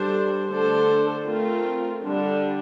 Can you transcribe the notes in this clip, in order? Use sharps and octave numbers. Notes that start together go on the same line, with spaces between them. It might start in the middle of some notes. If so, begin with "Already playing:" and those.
Already playing: G3 D4 A4 C5
D3 A3 D4 A4 C5
A3 C4 F4 A#4
D3 G3 D4